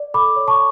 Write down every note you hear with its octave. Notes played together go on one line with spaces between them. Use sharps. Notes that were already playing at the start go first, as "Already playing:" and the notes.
Already playing: D5
A4 B5 D6
C#5
A5 C#6